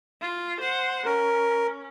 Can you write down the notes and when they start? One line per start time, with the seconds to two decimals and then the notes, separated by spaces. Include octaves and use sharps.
0.21 F4
0.60 C5 F#5
1.06 C#4 A#4